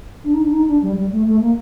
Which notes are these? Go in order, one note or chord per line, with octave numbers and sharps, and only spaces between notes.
D4
D#4
D4
D#4
D4
G3
G3
A3
A3
A#3